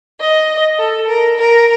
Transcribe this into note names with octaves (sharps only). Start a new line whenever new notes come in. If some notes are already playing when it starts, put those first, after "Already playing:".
D#5
A4
A#4
A#4